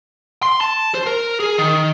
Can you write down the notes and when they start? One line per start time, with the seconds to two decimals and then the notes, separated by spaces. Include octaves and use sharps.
0.43 C6
0.61 A5
0.94 C5
1.06 A#4
1.40 G#4
1.58 D#3